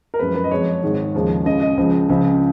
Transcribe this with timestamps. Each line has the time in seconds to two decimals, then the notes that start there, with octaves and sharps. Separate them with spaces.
0.14 A#4
0.19 F#2 F3 G#3 B4
0.35 B4
0.44 D#5
0.51 F2 F3 G#3 C#5
0.83 G#2 D#3 G#3
1.15 D#2 C#3 F3 G#3
1.45 C#2 C#3 G#3 D#5
1.62 D#5
1.77 C#2 C#3 F3
2.09 C#2 C#3 F3